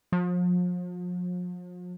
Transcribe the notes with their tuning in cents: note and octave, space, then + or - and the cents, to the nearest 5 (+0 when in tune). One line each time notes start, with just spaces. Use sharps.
F3 +40